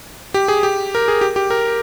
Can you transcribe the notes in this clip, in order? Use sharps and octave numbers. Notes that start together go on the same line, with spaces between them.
G4
G#4
G4
A#4
G#4
G4
G4
A#4